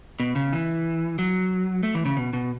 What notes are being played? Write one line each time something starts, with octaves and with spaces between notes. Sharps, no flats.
B2
C#3
E3
F#3
A3
E3
C#3
B2
B2